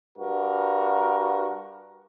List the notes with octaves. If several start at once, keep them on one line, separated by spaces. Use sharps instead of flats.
G2 F#4 A#4